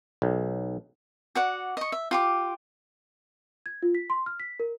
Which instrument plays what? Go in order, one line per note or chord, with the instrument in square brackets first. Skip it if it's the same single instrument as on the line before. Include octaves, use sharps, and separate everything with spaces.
[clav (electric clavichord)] B1
[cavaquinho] F#4 D5 F#5
D#5 C#6
E5
F4 G4 D6
[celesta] G#6
F4
B6
C6
F6
B6
A#4